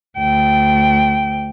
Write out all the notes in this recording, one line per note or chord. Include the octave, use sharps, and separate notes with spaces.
D2 G5